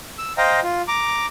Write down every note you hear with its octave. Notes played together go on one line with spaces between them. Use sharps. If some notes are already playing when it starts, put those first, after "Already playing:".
E6
C5 D#5 F5 G5 A#5
F4
A#5 D6